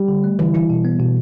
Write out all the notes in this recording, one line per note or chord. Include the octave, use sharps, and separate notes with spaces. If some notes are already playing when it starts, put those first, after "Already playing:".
Already playing: G3
D3
A3
D3 E3
E3 E4
B2
B3
B2